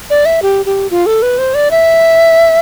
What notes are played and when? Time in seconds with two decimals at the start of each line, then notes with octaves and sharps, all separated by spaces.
0.10 D5
0.26 E5
0.42 G4
0.66 G4
0.91 F4
1.06 A4
1.22 B4
1.38 C5
1.54 D5
1.71 E5